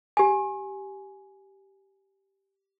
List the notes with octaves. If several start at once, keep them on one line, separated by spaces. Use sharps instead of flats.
G4 G#5